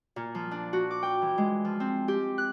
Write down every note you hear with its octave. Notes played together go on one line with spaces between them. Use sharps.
A#2
F3
D4
F#4
D6
G5
E3
G#3
F3
C4
G4
F#6